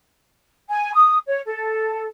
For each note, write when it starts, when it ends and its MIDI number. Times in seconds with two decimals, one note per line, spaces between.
0.69 0.93 80
0.94 1.17 87
1.27 1.39 73
1.46 2.05 69